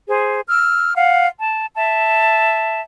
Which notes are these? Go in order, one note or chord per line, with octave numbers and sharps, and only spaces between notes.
G#4 C5
E6 F6
F5 F#5
A5
E5 A5